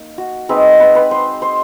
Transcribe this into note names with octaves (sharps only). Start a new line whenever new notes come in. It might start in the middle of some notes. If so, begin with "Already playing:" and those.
Already playing: A#3 D#4
F#4
G#3 C4 D#4 B4
B4
B4
C5
C5